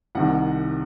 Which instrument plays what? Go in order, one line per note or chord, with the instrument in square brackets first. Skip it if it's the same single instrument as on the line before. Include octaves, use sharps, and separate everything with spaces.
[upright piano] C2 C3 D#3 F#5